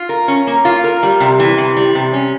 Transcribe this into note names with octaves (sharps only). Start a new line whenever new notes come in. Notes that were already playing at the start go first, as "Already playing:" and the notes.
Already playing: F4
A#4
C#4
A#3
F4
A#4
G3
C3
E3
C3
G3
C3
C#4